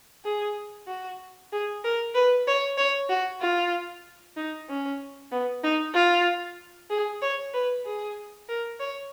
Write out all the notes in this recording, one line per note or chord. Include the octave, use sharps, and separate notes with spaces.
G#4
F#4
G#4
A#4
B4
C#5
C#5
F#4
F4
D#4
C#4
B3
D#4
F4
G#4
C#5
B4
G#4
A#4
C#5